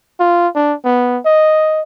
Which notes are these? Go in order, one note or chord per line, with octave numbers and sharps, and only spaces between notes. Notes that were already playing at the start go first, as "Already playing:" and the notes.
F4
D4
B3
D#5